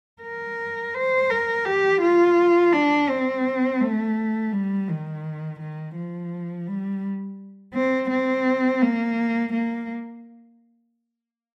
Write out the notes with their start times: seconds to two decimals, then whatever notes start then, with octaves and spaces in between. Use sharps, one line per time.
0.22 A#4
0.94 C5
1.30 A#4
1.65 G4
2.01 F4
2.73 D4
3.09 C4
3.81 A3
4.52 G3
4.88 D#3
5.60 D#3
5.96 F3
6.67 G3
7.75 C4
8.10 C4
8.82 A#3
9.53 A#3